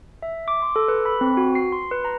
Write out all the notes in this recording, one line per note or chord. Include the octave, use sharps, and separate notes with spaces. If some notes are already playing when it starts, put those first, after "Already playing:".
E5
D6
C6
A4
B4
B5
C4
F#4
C7
C6
B4
A#5